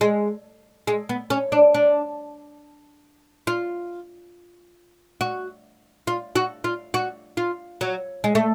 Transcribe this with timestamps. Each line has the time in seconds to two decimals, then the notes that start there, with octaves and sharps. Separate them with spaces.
0.01 G#3
0.87 G#3
1.09 B3
1.30 C#4
1.52 D4
1.74 D4
3.47 F4
5.21 F#4
6.07 F4
6.36 F#4
6.64 F4
6.94 F#4
7.37 F4
7.81 F#3
8.24 G#3
8.35 A3